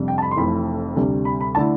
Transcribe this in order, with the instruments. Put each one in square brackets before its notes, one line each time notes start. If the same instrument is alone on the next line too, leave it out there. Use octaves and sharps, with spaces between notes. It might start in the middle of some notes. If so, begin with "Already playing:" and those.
Already playing: [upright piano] F2 C3 G3 D4
G5
A5
B5
C6
F1 F2 E3 A3 B5
D2 C3 G3
B5
B5
D3 A3 E4 A5